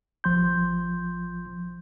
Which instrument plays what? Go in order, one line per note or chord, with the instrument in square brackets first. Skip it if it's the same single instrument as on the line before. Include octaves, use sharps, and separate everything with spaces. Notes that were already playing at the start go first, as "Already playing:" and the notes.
[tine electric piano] A1 F3 C6 G6